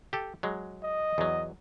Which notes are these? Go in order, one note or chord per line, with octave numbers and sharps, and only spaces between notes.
G4 A4
F#3 G#3
D#5
E2 F#3